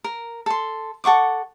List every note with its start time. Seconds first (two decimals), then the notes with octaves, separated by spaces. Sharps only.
0.04 A#4
0.46 A4 C6
1.04 A4 F#5 C#6 D6